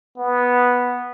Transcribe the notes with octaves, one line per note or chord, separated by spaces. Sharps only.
B3